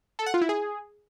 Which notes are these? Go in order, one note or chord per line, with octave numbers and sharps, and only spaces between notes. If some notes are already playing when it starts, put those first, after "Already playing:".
A4
F#5
F4
E4
G#4